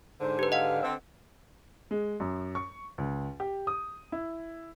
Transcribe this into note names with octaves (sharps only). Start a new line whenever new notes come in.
G#2 D3 C5
G4 B4
D#5 F5 F#5
D3 C4
G#3
F#2
C#6
C#2
G4
D#6
E4